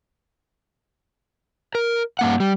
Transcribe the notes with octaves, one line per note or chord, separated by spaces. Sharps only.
A#4
G2 A#3 F#5
G3